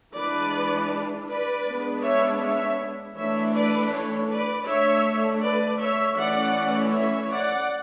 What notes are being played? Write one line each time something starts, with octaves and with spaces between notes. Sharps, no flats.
E3 G#3 D4 B4 D5
B4 D5
G#3 B3 D4
C#5 E5
C#5 E5
E3 A3 D4 C#5 E5
B4 D5
A4 C#5
B4 D5
D3 A3 D4 C#5 E5
B4 D5
C#5 E5
E3 A3 C#4 D5 F#5
C#5 E5
D5 F#5